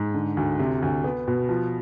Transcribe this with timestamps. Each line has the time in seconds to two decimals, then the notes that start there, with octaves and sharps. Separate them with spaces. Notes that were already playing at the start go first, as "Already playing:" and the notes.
Already playing: G#2
0.14 D3
0.37 D2
0.59 C3
0.82 D2
1.04 B3
1.27 B2
1.49 F3